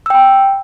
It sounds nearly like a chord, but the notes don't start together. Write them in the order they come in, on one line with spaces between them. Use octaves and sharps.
E6 G5 B5